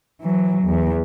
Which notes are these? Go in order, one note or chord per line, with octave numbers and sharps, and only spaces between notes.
E3 F#3
E2